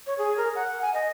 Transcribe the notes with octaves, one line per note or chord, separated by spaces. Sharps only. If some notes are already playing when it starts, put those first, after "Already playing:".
C#5
G#4
A#4
F#5
G#5
D#5